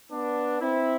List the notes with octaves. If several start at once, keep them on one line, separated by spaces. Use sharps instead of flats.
B3 D4
C4 E4